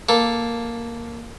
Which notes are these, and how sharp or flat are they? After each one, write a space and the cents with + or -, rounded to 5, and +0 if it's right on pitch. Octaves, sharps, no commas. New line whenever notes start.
A#3 +0 A4 +0